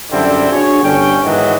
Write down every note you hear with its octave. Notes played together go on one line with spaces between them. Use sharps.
F#2 D3 G3 C4 E4
D4 F#4 G#4 C#5
G1 D3 C#4 G5
G#2 D#3 E3 F#3 B3